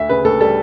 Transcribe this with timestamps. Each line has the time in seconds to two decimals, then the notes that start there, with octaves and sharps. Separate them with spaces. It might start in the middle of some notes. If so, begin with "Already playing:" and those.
Already playing: D2 E5
0.09 C#3 B4
0.24 D2 A4
0.40 G3 A4